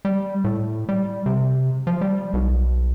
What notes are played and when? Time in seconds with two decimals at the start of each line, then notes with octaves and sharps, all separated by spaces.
0.05 G3
0.44 A2
0.89 G3
1.26 C3
1.87 F3
2.01 G3
2.33 B1